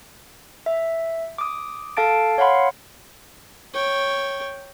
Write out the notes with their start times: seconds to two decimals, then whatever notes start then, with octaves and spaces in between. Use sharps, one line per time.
0.66 E5
1.38 D6 D#6
1.97 A4 F5 A5 A6 D7
2.38 C#5 F5 F#5 B5 C6
3.74 C#5 G5